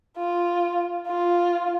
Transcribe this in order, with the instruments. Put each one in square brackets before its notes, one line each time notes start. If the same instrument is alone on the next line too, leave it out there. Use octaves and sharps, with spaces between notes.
[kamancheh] F4
F4